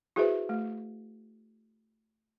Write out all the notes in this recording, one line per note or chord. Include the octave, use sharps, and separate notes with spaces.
E4 F#4 G#4 B4 C5 E5
A3